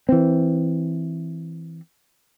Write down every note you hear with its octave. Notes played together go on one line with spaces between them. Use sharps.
E3 C4